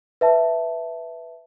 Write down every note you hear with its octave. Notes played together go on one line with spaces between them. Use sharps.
B4 E5 A5